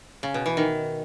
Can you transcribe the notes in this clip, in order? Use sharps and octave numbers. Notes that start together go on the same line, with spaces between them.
C#3
B2
E3
D#3